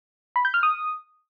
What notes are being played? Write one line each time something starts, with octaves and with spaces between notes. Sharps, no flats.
B5
G6
F6
D#6